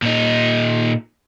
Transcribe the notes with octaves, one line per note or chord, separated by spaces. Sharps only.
A#2 D#4